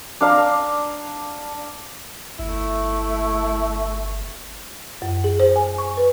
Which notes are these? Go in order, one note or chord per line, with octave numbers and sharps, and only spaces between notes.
D4 F5 A#5
G1 A3 E4
F#2
G#4
C5
G#5
C#6
B4